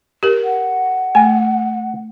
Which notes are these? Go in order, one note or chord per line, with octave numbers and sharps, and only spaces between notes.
G4 A#4
F#5
A3 G#5